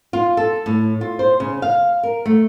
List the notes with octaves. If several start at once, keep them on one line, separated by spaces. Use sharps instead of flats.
F4
A4
A2
F4
C5
C#3
F5
A#4
A3